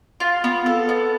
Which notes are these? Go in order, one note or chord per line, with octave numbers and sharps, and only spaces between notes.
F4
B3
A4
B3